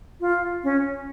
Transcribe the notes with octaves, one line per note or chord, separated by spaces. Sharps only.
F4
C#4